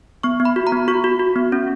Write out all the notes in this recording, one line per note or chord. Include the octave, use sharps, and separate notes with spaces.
B3 C#6
B3
B5
F#4
A#5
B3
F#4 C#6
F#4
F#4
B3
C#4